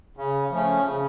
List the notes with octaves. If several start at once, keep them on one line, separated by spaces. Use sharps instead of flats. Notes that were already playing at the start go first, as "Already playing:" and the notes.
C#3
F3 A3 C#4
C#3